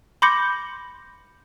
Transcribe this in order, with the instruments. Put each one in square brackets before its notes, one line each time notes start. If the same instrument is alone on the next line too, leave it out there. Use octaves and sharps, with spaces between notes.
[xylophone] B5 C6 D6 G6 A#6 C#7